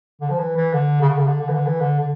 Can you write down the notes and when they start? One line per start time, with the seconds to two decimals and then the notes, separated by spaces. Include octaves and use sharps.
0.21 D3
0.30 F3
0.39 E3
0.57 E3
0.73 D3
1.01 C#3
1.09 D3
1.18 C#3
1.27 D3
1.41 D3
1.49 E3
1.54 D3
1.67 E3
1.81 D3
2.00 D3